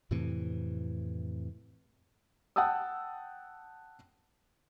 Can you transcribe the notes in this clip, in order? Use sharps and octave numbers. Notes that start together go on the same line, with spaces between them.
F2 A2 C3 E3
F#5 G5 A5 D#6 E6